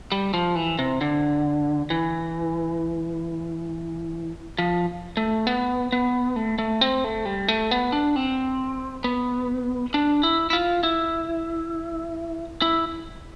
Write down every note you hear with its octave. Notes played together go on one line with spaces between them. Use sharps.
G3
F3
E3
C3
D3
E3
F3
A3
B3
B3
A3
A3
C4
A3
G3
A3
B3
D4
C4
B3
D4
E4
E4
F4
E4
E4